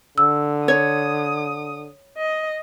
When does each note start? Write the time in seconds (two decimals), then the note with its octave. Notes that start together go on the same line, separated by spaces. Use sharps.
0.18 D3 E6
0.68 C#5 D#6
2.17 D#5